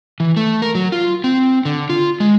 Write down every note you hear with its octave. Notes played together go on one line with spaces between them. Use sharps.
E3
A3
A#4
F#3
F4
C4
D3
F4
G#3